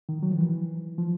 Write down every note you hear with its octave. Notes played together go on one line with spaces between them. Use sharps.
D#3
F#3
F3
E3
F3